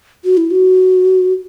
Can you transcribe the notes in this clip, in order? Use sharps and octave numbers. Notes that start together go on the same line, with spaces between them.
F#4
E4
F#4